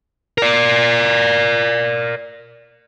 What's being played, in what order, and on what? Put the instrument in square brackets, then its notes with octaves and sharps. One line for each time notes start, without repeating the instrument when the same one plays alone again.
[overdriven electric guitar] A#4 D5